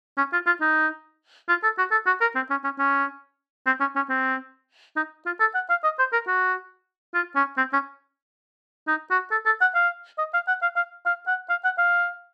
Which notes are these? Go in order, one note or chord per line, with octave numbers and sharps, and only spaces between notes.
C#4
F4
F4
D#4
F4
A4
F#4
A4
F#4
A#4
C4
C#4
C#4
C#4
C4
C#4
C#4
C4
D#4
F4
A4
F#5
F5
D#5
C5
A#4
F#4
F4
C#4
C4
C#4
D#4
F#4
A4
A4
F#5
F5
D#5
F5
F#5
F5
F5
F5
F#5
F5
F#5
F5